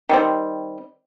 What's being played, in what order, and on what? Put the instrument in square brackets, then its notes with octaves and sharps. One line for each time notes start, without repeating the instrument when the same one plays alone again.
[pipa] D#3 G3 C4